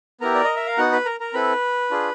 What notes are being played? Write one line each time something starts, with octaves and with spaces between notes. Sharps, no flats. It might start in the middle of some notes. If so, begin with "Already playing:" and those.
B3 E4 G4 A#4 A#5
D5
D#5
E5
F5
B3 D#4 F#4 F#5
B4 B5
A#4 A#5
A#4 A#5
C4 E4 A4 B4 B5
D4 F4 G#4